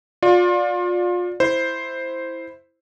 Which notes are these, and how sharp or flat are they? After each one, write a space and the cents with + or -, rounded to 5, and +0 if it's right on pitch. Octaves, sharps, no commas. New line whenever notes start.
F4 +30 D5 +0
E4 +0 C5 +0